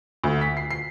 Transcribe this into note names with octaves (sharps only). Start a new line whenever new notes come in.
D2
B6
C7
C7